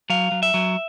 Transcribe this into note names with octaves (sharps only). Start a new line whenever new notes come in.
F#3 F5
F#3
E5
F#3